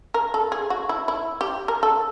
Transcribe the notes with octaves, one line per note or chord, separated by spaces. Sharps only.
A#4
A4
G#4
F#4
E4
E4
G4
A#4
A4